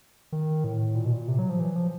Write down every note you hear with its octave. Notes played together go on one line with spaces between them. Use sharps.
D#3
A2
A#2
B2
A#2
C3
F#3
F3
E3
F3